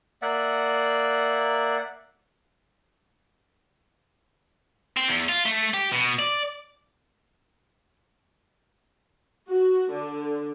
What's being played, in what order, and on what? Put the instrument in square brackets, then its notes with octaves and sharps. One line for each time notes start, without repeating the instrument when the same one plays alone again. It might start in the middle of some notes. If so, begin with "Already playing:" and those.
[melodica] A#3 D5 E5 F#5
[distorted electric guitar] C4
E2
F4
A3
G4
B2
D5
[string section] F#4
D3